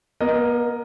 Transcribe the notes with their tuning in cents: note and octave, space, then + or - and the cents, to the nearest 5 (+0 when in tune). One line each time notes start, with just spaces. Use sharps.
B3 -45 A#4 +0 D#5 +0